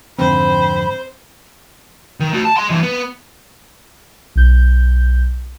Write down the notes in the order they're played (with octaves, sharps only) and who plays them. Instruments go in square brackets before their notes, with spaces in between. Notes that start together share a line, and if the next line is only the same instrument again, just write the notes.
[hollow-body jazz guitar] F2 G#2 D3 [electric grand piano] C4 [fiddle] C5 [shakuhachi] B5
[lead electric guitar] D#3
A3 F#4
A5
D#5 C6
G2 E3
B3
[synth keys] B1 G6